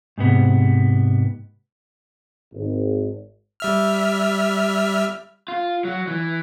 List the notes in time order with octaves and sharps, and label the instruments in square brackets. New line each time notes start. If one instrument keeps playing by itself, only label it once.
[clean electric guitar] G#2 C3 B3
[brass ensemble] G#1
[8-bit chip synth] G3 E5 F6
[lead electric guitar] F4
F#3
E3